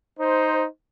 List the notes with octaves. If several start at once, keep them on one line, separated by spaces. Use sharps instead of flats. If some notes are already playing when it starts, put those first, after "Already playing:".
D#4 C5